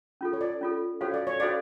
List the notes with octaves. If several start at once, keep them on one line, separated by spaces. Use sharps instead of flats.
C#4 F4 A4
C#5
D5
C#4 F4 A4
C#4 F#4 A4 C5 C#5 F5
D5
C#5
C#4 F#4 A4 C5 D5 F5